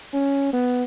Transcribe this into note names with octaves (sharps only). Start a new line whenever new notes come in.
C#4
B3